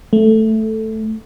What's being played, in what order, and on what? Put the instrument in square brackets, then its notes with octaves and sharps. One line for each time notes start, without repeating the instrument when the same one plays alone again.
[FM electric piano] A3